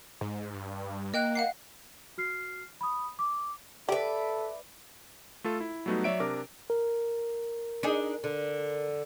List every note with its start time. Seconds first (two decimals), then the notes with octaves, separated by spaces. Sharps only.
0.21 G#2
0.54 G2
1.14 A#3 D#5 G5 F#6
1.35 F5 F#5 C7
2.18 F#4 F6 C7
2.81 B5 D#6
3.19 D6
3.89 G4 A4 B4 D5 E5
5.44 A3 F4 A4
5.60 E4
5.86 F#3 G3 A3 B3 D#4 F#4
6.04 F#3 C#5 D5 E5 D7
6.20 C3 D4 A#4 D6
6.70 A#4
7.83 D4 D#4 G#4
8.24 D3